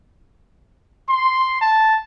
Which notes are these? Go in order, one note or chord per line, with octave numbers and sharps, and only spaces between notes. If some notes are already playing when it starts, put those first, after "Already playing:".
C6
A5